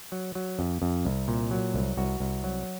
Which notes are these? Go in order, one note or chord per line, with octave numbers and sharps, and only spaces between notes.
F#3
F#3
F2
F2
C2
A#2
F#3
C2
C2 F#4
C2
F#3